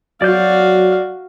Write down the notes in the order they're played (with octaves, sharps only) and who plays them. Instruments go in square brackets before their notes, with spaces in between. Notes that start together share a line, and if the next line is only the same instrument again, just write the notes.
[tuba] F#3 [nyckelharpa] F#4 F5 [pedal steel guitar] D5 G6